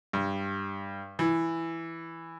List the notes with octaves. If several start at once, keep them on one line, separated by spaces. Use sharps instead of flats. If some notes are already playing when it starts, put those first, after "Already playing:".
G2
E3